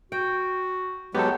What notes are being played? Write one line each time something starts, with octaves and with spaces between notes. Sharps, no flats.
F#4 G5
F#3 G#3 B3 G4 A4